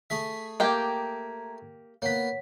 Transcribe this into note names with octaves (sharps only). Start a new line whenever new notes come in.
A3 G#4 E5 B6
A#3 G4 G5 A#5 G#6
A#3 B3 C#5 F#5 B6